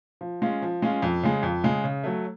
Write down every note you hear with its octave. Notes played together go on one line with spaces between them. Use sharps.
F3
G#3 C#4 F4
F3
G#3 C#4 F4
F2
C#3 G#3
F2
C#3 G#3
C#3
F#3 A3